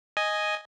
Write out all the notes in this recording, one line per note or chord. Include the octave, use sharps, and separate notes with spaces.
D#5 G#5